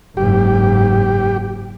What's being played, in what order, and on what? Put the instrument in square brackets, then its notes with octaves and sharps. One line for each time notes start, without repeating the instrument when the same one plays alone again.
[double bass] F#1 G#2 [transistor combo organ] G4